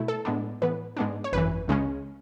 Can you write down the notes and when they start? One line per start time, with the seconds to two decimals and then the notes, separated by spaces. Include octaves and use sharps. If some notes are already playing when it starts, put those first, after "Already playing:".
Already playing: B2 A3 E4
0.08 A4
0.25 A2 G#3 B3 D4
0.62 A2 E3 B3 B4
0.97 G#2 G#3 B3 D4
1.24 C#5
1.33 G#1 F#2 E3 B4
1.68 C#2 C#3 G#3 C#4